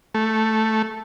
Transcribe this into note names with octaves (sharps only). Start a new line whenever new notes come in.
A3